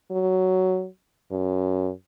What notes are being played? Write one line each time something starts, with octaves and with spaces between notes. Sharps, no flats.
F#3
F#2